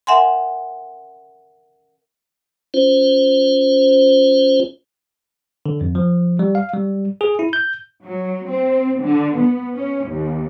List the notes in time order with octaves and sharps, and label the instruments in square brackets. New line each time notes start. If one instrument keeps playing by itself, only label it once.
[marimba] A#4 E5 F#5 G#5 C6
[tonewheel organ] C#4 F4 C5
[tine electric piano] D3
F2
F3
G3
F5
G3
G#4
E4
G6
[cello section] F#3
C4
D3
B3
C#4
D#2